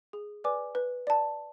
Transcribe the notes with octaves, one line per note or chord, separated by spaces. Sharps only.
G#4
B4 D5 G#5 D6
B4
D5 A5